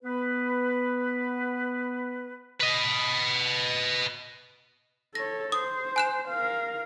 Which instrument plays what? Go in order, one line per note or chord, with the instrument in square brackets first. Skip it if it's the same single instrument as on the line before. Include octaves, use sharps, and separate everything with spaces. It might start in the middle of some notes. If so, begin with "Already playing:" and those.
[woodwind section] B3 B4
[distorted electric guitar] B4 D#5
[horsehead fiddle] A4 C#5 [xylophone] A#6
[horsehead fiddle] C5 [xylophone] D#6
[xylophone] G#5 F#6 E7
[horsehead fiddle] A#4 F5